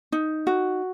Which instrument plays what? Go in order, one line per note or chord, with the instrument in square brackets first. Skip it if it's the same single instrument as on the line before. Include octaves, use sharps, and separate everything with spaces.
[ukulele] D#4
F#4